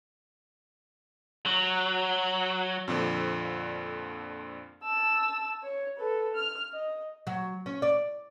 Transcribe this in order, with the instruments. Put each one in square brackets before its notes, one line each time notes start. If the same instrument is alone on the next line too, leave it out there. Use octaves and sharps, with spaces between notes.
[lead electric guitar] F#3
[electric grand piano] F2 A#2 D3 F3
[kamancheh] A5 E6
C#5
A4 B4
F6
D#5
[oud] F#3
C#4
D5